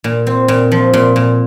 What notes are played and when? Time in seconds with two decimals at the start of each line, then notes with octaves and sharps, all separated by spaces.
0.04 A#2
0.27 C4
0.48 A#2
0.72 F3
0.94 A#2
1.16 A#2